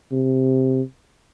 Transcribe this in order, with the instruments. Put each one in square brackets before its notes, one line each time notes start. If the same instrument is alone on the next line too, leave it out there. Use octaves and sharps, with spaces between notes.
[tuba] C3